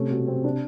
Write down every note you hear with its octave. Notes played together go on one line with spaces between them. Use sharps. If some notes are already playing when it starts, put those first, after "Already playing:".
Already playing: C3 A3 C#4
B2
C4
D4